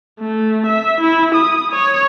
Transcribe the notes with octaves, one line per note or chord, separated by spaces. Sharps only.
A3
E5
E4
D#6
C#5